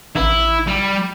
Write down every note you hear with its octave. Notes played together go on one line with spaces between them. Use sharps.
A1 E4
G3